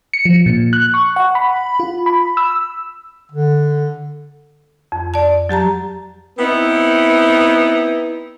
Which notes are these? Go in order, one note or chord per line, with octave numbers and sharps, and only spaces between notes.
C#7
F3
A#2
F#6
C#6
F#5
B5
F4
B5
E6
D3
F2
D5 A5
F#3 G4 A5 A#5
B3 C4 D#4 E4